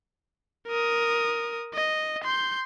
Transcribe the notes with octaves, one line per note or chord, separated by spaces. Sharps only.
A#4 D#6
D#5
C6 G6